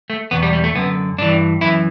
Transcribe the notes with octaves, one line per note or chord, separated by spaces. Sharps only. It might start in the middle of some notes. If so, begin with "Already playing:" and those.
A3
E2 B2 B3
G3
G3
A3
F#2 D3 B3
G2 E3 D4
F#2 E3 E4